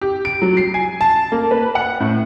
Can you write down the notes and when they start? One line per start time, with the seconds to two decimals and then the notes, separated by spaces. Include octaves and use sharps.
0.01 G4
0.25 D7
0.42 F#3
0.57 C7
0.74 G#5
1.01 A5
1.32 A#3
1.51 B4
1.75 F#5
2.00 A2